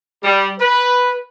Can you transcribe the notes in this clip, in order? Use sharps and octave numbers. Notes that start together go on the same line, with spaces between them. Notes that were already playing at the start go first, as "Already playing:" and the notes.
G3
B4